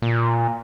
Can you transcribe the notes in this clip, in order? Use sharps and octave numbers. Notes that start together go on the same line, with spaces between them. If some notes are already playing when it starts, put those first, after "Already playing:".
A#2